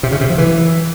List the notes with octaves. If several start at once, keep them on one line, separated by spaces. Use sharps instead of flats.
C3
C#3
C3
F3
E3